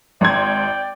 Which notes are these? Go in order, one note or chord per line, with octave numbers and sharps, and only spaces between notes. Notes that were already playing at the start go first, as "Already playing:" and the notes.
G#1 D5 G5 C6 G#6